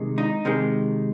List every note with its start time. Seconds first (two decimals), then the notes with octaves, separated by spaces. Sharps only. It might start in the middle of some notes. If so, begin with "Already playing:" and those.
Already playing: C3 D#3 G#3
0.18 D#4
0.45 C3 D#3 G#3